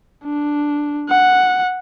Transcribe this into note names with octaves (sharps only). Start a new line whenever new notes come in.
D4
F#5